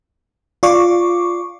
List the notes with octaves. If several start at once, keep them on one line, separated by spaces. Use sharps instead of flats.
F4 D5 C#6 D6